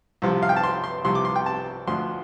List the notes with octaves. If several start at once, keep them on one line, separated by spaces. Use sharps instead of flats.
C2 C3 F3
F5
G5
A5
C6
C6
C2 C3 F3 C6
D6
C6
G5
A5
D2 D3 F3 C6